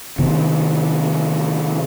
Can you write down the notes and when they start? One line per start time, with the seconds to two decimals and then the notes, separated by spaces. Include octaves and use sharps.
0.19 C3 D#3 B3